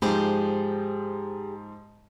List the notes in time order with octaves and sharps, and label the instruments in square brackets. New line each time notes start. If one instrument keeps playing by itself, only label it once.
[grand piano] G#2 F3 [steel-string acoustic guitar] G4 G#4 C5